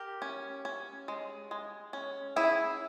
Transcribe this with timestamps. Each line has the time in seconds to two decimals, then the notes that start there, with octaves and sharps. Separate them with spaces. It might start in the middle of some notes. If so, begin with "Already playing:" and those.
Already playing: G4 A#4
0.22 C#4
0.65 C#4
1.08 G#3
1.51 G#3
1.93 C#4
2.36 C#4 E4 G#4